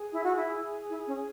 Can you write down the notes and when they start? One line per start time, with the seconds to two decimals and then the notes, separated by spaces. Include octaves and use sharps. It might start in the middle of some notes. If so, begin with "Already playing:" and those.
Already playing: G#4
0.13 E4
0.24 F#4
0.36 E4
0.90 E4
1.07 C#4